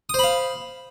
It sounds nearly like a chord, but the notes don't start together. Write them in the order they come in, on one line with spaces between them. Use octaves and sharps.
D#6 C5 B5 F5